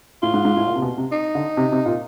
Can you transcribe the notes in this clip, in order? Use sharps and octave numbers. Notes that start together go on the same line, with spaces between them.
A2 F4
G#2
G#2
A2
A#2
C3
B2
C3
D#4
D3
C3
C3
A#2